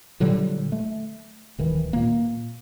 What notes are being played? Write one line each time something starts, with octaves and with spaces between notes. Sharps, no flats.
A#2 D3 F#3 G3
A3
D1 D#3 E3
A#2 A#3